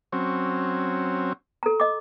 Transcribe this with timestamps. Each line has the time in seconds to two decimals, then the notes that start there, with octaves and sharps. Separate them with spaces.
0.12 F#3 C4 C#4
1.63 A4 A#5
1.80 D#5 D6